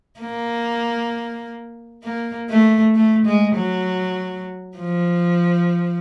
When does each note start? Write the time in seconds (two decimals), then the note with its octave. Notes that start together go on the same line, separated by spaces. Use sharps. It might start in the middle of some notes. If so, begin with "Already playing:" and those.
0.20 A#3
2.04 A#3
2.49 A3
2.95 A3
3.26 G#3
3.55 F#3
4.78 F3